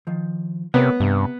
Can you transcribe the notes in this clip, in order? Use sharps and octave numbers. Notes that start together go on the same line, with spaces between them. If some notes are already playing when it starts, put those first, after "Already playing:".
D#3 F3
C3 B3 A#4 C#5
G2 C3